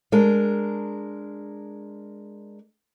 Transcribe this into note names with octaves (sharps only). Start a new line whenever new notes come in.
G#3 D4 A#4